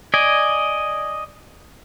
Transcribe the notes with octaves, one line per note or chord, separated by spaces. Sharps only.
D5 D#5 G#5